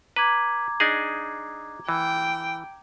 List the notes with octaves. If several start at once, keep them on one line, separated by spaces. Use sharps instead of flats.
B4 A#5 D6 G#6
D4 D#4 G#4
E3 G5